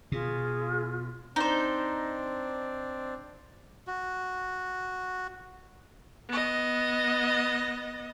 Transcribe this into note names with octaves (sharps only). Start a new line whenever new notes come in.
B2 F4 G#4
C4 D4 D#4 C5
F#4
B3 D#5